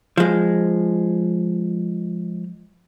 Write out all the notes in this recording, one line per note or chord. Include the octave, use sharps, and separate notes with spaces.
F3 G#3